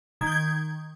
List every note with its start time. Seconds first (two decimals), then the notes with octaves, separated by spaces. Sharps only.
0.21 D#3 G#6
0.27 G6
0.32 G#6